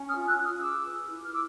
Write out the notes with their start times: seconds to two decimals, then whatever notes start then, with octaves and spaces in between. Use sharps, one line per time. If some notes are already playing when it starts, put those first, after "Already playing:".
Already playing: C#4
0.08 D#6 F6
0.15 F4
0.27 E6 F#6
0.39 F4
0.44 D#6 F6
0.62 G#4 D6 E6
0.85 B4
1.09 E4
1.25 F6
1.33 D6 E6